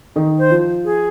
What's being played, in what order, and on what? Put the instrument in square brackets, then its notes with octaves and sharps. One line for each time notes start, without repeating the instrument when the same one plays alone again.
[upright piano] D#3 D#4
[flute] C5
[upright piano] F3 F4
[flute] G#4